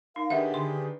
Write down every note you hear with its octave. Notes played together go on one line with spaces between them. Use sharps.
D#4 A#4 F5
D#3 D4 G4 G#4 B4 E5 F#5
D3 C6